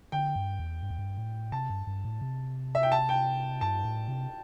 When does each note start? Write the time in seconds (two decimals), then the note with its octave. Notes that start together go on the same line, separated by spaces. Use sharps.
0.12 D3 G5
0.36 G2
0.60 E2
0.83 G2
0.90 E2
0.99 G2
1.17 A2
1.52 C3 A5
1.70 G2
1.87 G2
2.05 A2
2.22 C3
2.75 E5
2.83 G5
2.92 A5
3.09 G5
3.61 G2 A5
3.85 A2
4.08 C3